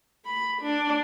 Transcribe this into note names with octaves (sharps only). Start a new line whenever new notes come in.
B5
D4